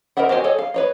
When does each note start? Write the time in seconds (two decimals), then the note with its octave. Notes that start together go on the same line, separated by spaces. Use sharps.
0.17 A#4 C5 D#5 E5 F#5
0.29 F#4 G4 C5 D#5 G#5
0.44 G#4 A4 C#5 D#5 G#5
0.59 F5
0.74 B4 C#5 D#5